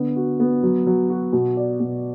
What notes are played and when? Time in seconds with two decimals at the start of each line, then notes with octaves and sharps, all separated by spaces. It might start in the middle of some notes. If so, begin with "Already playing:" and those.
Already playing: D3 B3
0.16 F#4
0.40 B3
0.63 F#3
0.87 F#3
1.10 F#4
1.33 B2
1.57 D5
1.80 B2